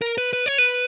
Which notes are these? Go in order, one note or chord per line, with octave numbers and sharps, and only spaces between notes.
A#4
B4
B4
C#5
B4